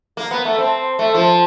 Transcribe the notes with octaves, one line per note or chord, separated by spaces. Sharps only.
A#3
B3
A3
C4
A3
F3